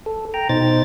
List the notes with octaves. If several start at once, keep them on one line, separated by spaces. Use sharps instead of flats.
A4
G5 A#5
B2 D#4 C5 A6